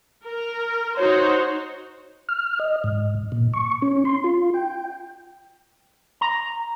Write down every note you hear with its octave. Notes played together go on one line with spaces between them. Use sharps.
A#4
D#4 F#4 C5 C#5
F6
D#5
G#2
A#2
C#6
C#4
C6
F4
G5
A#5